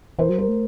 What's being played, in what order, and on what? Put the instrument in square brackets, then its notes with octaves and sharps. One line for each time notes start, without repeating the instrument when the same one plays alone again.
[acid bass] E3 [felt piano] A#4 C5
[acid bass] F#3
[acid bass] G3 [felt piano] A#4 C5
[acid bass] A3